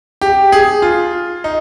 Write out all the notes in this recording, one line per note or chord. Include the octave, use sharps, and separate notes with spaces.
G4
G#4
F4
D#4